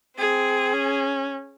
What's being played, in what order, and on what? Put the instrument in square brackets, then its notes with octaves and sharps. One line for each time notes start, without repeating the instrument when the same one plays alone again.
[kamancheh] C4 [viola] G#4
[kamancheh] C#4